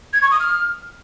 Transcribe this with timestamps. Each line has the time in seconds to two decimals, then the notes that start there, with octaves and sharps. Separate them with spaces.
0.13 G#6
0.22 C#6
0.31 D#6
0.40 F6